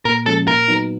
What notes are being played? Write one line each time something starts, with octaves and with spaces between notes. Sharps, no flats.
A#2 A#4
F3 G#3 C#4 A4
A#2 A#4
F#3 B3 D#4